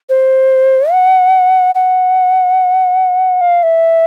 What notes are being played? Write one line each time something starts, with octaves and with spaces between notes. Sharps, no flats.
C5
F#5
F#5
F5
E5